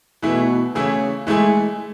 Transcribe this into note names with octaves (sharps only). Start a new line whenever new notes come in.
B2 E3 A3 E4 G#4
C#3 E3 A3 E4 G#4
E3 G#3 A3 E4 G#4